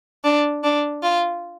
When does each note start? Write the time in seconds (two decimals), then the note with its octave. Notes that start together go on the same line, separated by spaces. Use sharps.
0.24 D4
0.64 D4
1.03 F4